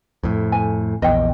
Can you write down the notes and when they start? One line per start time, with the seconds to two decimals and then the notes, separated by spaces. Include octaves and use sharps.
0.23 F2 A2
0.52 G#5
1.02 A#1 E2 D#5 G5